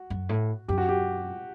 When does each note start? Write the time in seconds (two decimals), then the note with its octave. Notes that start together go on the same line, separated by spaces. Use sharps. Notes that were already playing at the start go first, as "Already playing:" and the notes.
Already playing: F#4
0.10 F#2
0.29 A2
0.68 F#2 G4
0.78 F#4
0.89 G4